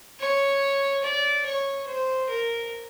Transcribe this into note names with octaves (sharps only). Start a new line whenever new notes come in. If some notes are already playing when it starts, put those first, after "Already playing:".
C#5
D5
C#5
C5
A#4